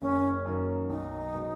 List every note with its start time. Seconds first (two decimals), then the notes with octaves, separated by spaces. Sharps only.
0.02 F#1 C#4
0.46 F#2 D#3 A#3
0.89 B1 D#4
1.34 B2 G#3